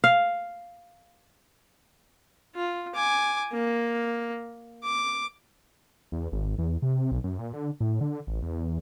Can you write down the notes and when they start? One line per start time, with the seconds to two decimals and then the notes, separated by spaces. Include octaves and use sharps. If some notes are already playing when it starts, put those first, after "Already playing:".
0.04 F5
2.56 F4
2.95 G#5 D6
3.52 A#3
4.83 D6
6.12 E2
6.32 G#1
6.58 E2
6.82 C3
7.11 B1
7.24 F#2
7.39 A#2
7.53 D3
7.80 A2
8.01 D3
8.27 A1
8.42 E2